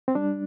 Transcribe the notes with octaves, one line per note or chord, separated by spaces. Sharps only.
C4
G3 D4